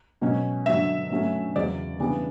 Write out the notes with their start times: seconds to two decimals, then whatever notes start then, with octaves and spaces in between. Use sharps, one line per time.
0.21 B2 F#3 C#4
0.66 G2 D3 F#3 E5
1.10 G2 F#3 A3 C#4
1.56 E2 C#3 F#3 D5
2.00 C#3 E3 G3 B3 D4